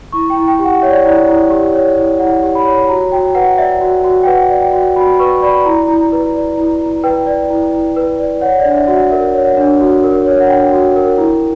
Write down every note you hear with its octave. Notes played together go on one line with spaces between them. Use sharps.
E4 C#6
G5
E4
G5
G4
F#5
C#5 E5
D5
E4 D5
E4
G4
C#5
E4
E4 F#5
G4
B5
C#5
F#4 A#5
F#4 G5
B4 F#5
D5 E5
F#4
F#4
G5
B4 F#5
D5
G5
F#4
F#4 B5
B4 C#6
D5 B5
E4 A#5
E4
B4
D5
E4
E4
B4 G5
D5
E4
E4
B4
D5
C#5 F#5
D5
D4
E5
F#4 F#5
E5
A#4 E5
C#5
F#5
D4
F#4
A#4
C#5
F#5
D4 G5
F#4
A#4
E4